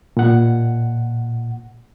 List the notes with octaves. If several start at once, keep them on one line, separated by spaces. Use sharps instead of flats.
A#2 F#5